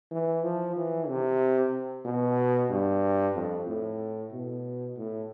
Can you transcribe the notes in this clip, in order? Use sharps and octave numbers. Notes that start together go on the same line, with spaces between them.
E3
F3
E3
C3
B2
G2
F2
A2
B2
A2